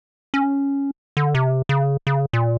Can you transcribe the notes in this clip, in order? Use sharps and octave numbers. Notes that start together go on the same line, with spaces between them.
C#4
D3
C3
C#3
C#3
A#2